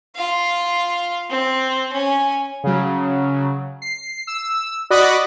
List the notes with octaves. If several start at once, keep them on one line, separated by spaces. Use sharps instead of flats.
F4 F5
C4
C#4 G#5
C#3 F#3
C7
E6
F#4 D5 D#5 B5 F#6